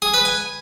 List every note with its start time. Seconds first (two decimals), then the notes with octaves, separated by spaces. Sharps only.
0.02 G#4
0.14 B4
0.25 G#5